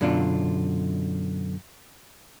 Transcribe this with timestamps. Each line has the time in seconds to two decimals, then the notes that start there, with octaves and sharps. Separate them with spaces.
0.01 F#2 B2 D3 D4 F4